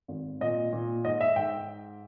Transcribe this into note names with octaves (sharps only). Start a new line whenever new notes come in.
G#1
A#2 D#5
A#2
G#2 D#5
E5
G#2 G5